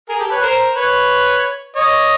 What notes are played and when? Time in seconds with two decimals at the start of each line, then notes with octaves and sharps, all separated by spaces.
0.09 G#4 A#4
0.20 G4 A4
0.30 B4 C#5
0.42 A#4 C5
0.75 B4 C#5
1.76 C#5 D#5